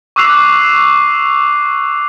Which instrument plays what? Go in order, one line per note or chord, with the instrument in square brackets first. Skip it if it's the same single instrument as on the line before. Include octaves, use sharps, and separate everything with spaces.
[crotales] C#6 D6 E6 F#6 C7 F7